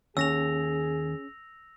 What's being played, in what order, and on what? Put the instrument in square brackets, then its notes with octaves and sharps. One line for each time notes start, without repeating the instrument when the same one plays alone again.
[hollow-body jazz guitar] D#2 [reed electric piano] C#4 [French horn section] G#4 [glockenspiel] E6 A#6 F7